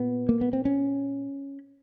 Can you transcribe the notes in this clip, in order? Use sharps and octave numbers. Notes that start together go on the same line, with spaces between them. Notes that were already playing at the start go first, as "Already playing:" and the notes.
Already playing: A#2 B3
A#3
B3
C4
C#4